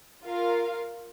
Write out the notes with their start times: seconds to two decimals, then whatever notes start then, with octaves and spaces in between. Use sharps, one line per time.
0.23 F4 A#4 F5